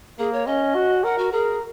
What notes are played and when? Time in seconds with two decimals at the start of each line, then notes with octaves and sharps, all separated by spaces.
0.19 A#3 G#4
0.33 C#5
0.47 C#4 D#5
0.75 F#4
1.04 A#4 F#5
1.18 F#4
1.32 G#4 A#4